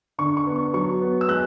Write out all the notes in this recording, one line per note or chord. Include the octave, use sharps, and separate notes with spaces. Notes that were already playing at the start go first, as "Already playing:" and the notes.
D3 C#6
C#6
B3
C#6
F#3 C#6
B3
E6
G#3 F#6